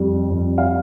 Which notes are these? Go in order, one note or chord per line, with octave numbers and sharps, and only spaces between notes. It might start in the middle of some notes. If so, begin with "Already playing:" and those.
Already playing: F2 G3
F2
F5